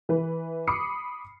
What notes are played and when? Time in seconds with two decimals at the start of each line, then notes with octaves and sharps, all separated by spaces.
0.09 E3 B4
0.67 B5 D6 D#6 C7 C#7